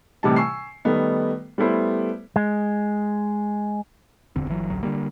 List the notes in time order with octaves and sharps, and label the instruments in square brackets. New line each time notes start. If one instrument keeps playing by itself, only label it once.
[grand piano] A2 C3 E3 G3 D#4 A5
G#5 C#6 E6 C7
D#3 G3 A3 B3 D#4
G3 A3 B3 E4 C5
[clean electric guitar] G#3
[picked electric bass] D#1 E2 D3 C4
G1 E3 F#3
A1 D2 F#3
D3 E3 G3 A#3